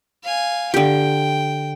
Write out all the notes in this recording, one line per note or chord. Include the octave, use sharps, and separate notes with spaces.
F5 G#5
D3 G4 G5